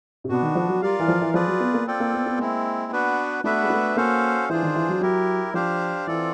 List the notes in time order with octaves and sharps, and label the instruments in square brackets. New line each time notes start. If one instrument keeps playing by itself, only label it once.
[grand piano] C3
[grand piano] B2 [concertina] B3 D4 F#4
[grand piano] D#3
F3
F#3
[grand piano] G3 [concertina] F4 A#4 D5 F5
[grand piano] E3
F3
E3
[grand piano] F3 [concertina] F4 G#4 B4 D5
[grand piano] F#3
B3
A#3
[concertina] C4 F4 A4 D5 G5
[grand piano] A#3
B3
B3
[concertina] G#3 C4 E4 [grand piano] A#3
[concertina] B3 D4 F#4 B4
[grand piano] A3 [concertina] B3 D4 F#4 B4 E5
[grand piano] G#3
A3
[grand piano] A#3 [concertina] C#4 F#4 A4 C5 F5
[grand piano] E3 [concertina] D4 F4 G#4 C5
[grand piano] D#3
E3
F#3
[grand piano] F#3 [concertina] E4 G4 A#4
[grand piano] F3 [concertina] D4 G4 C5 F5
[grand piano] E3 [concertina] C4 F4 A4 D5